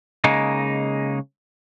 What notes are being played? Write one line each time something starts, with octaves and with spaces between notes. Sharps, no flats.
C#3 G#3 A#3 D#4